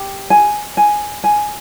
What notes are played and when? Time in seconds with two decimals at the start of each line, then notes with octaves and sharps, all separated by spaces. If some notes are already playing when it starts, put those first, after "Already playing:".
Already playing: G4
0.30 G#5
0.77 G#5
1.24 G#5